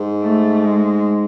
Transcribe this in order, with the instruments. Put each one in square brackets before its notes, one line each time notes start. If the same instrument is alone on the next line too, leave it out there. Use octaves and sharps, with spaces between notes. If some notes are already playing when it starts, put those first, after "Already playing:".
Already playing: [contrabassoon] G#2
[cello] A3
G#3